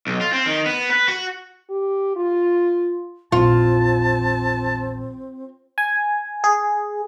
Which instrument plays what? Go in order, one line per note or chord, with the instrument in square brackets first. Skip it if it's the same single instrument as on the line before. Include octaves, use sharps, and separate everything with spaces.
[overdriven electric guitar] B1
F4
C4
D#3
B3
B4
F#4
[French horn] G4
F4
[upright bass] A#1 E2 [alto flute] C4 [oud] F4 [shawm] A5
[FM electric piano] G#5
G#4